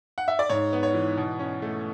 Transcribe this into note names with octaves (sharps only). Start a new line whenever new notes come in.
F#5
E5
D5
G#2 C#5
B3
C#5
E3
B2
C#4
A3